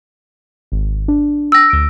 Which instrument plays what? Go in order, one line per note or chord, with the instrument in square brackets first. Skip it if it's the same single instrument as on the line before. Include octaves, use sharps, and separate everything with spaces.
[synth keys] G#1
D4
[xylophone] E6 A#6
[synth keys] D2 D7